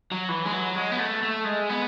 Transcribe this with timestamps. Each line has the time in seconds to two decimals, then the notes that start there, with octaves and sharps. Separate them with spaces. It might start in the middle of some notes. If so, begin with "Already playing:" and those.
0.11 F#3
0.29 E3
0.45 G#3
0.53 F#3
0.75 G#3
0.91 B3
0.99 A3
1.22 A3
1.45 G#3
1.69 B3